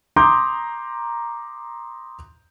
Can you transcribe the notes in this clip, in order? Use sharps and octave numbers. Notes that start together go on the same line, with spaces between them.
A#5 C6 D6 D#6 G6